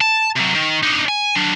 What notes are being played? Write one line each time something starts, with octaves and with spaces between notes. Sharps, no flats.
A5
C3 F#3
D#3
D4 D#4
G#5
F#3 D4